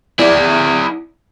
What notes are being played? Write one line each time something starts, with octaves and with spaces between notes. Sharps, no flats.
E4 D5